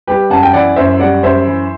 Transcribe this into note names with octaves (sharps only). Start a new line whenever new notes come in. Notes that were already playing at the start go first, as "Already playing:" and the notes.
G3 G4 B4
F#2 F#5 A5
G5
E3 D5 F#5
F#2 C5 E5
G3 D5 F#5
F#2 C5 E5
E3